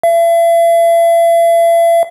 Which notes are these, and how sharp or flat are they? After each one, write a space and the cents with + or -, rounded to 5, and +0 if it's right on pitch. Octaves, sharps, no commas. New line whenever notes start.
E5 +40